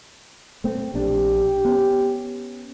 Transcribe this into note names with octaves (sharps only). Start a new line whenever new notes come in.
A3 C4
A#1 D4 G4
B3 C#4